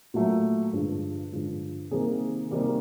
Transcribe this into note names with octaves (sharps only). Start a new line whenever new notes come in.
A#2 F#3 A3
G2 D3 F3 G#3
G2 D3 F3 G#3
C3 D#3 G3 A#3 G#4
C3 D#3 G3 A#3